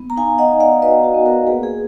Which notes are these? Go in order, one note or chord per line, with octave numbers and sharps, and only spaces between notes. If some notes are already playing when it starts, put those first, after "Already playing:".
Already playing: B3
A#5
D#4 F5 G#5
D#5 F#5
D#4
D5 F5
F#4 B4 D#5
F#4
B3
F#4 A#4
A#3 G#4 B4
G#4